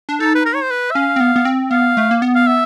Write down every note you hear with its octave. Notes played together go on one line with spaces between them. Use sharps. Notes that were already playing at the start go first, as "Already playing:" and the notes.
D4
D#4 A4
B4
A#4
C#5
C5
B4
E5
C#4 F5
C4
B3
B3
C4
B3 F5
A3
A#3
B3
F5
E5